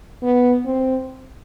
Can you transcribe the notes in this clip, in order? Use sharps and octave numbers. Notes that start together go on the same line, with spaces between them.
B3
C4